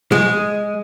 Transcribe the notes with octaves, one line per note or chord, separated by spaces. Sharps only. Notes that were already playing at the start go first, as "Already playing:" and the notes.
G#3